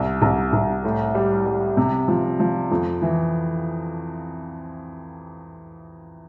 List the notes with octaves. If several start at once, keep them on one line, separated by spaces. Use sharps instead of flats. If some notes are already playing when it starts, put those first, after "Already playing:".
Already playing: C2
C2
C2
A2
G3
G3
C3
F3
F3
F2
E3